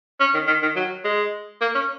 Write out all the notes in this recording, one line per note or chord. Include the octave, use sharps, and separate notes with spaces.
C#4
D#3
D#3
D#3
F#3
G#3
A#3
C#4